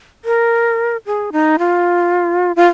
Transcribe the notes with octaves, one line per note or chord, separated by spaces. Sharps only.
A#4
G#4
D#4
F4
F4